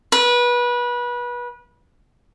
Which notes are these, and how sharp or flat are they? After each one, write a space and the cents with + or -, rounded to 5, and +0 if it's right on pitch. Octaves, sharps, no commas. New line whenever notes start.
B4 -25